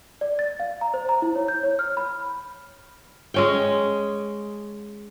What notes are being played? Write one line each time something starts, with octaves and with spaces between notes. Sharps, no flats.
D5
A6
F5
A#5
C5
A#5
E4
C#5
G6
C#5
F6
B5
G#3 C#4 G5